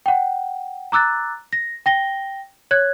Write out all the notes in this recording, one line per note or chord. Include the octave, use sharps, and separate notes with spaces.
F#5 G5
A#5 D6 E6 F#6 A6
A#6
G5 A#6 G7
C#5 F#6 G#6